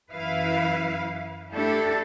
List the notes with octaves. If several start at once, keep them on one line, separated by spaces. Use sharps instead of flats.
F#2 E3 E4 B4 F5
A3 D4 E4 G4 A4